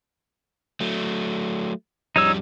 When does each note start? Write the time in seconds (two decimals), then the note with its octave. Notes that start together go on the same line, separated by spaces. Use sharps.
0.80 F#3 A3
2.16 F2 G3 D#4 C#5 E6